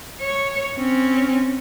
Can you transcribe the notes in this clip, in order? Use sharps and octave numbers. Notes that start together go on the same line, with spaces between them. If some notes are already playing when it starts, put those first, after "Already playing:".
C#5
C4 C#4